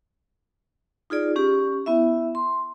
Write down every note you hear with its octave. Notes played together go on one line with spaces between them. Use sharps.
D#4 F4 G#4 D5
C#4 G4
B3 E4 E5
C6